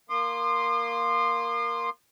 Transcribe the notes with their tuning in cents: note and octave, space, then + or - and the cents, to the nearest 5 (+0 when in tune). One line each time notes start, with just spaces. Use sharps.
A#3 +0 C6 +0 D#6 -45